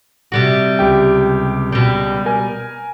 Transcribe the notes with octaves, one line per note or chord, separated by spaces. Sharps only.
C3 G3 F#4
C#2 G4 G5
B2 G3
A#4 G#5